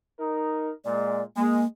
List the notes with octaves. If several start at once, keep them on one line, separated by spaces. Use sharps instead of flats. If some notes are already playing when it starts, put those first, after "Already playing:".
D#4 A#4
A#2 G#3 D5
G#3 A#3